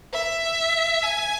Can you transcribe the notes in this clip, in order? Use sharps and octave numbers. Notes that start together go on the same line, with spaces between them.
E5
G#5